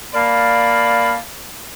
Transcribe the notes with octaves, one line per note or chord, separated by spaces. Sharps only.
A#3 D5 F5 A5 B5